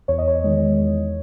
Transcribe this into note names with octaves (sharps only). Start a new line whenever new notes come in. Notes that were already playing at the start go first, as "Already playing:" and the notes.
E2 C#5
D#5
C#5
D#3 G#3
E2